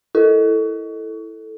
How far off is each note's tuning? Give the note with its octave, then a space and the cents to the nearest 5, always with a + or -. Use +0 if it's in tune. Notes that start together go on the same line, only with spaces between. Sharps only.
E4 +0 A4 +0